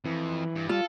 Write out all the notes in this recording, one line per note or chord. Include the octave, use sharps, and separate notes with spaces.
F2 E3
G2
G3 F4 A4